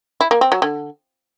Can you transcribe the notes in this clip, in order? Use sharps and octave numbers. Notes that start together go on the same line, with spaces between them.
E4
A#3
C4
F#3
D3